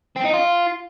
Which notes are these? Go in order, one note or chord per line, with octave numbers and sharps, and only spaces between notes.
C4
D#4
F4